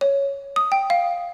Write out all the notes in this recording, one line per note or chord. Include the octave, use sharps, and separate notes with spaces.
C#5
D#6
G5
F5